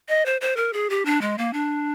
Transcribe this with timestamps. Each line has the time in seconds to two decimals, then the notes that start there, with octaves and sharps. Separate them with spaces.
0.08 D#5
0.26 C5
0.41 C5
0.57 A#4
0.73 G#4
0.90 G4
1.05 D4
1.21 G#3
1.38 A#3
1.53 D4